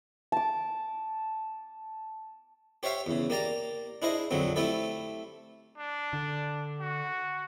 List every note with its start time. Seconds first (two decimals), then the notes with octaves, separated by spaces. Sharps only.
0.32 A5 D6
2.83 G4 C5 C#5 E5 F5 G5
3.06 E2 C#3
3.30 A#3 G4 D5 A#5
4.02 D4 E4 G#4 C5 D#5
4.31 A#1 F2 D3 F#3 C4
4.56 A3 C4 E4 G4 A4
5.78 D4
6.13 D3
6.81 F#4